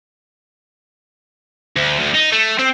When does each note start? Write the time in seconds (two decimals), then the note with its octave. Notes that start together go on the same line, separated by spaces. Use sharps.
1.77 D2
1.99 D2
2.14 D#4
2.32 A3
2.59 C4